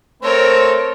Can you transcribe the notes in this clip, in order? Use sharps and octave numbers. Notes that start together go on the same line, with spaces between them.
A3 C4 A#4 C5 C#5